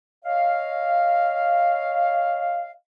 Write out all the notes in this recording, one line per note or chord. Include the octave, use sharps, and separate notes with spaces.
C#5 D#5 F5